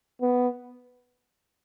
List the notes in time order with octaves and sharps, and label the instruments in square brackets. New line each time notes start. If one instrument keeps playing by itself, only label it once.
[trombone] B3